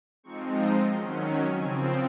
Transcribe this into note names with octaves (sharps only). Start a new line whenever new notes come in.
F3 G#3 C4 D#4 C#6
D#6
D#3 F#3 C#4 C6
G#5
C#3 F3 C4 G#5